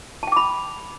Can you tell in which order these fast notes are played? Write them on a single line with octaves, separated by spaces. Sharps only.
A5 G5 D6 B5